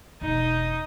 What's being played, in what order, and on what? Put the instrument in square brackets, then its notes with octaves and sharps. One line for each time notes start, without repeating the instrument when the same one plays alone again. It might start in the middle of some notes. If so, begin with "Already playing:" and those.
[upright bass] E1 [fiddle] D#4 D#6